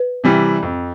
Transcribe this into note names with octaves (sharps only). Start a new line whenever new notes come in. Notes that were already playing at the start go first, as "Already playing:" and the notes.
Already playing: B4
C3 E3 G3
F2